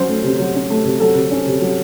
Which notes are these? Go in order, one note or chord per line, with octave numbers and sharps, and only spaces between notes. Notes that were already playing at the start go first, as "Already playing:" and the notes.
Already playing: F#3 C#4 C5
A3
C3
F#3
C#4
A3
C3
F#3 A4
C3
C#4
C3
F#3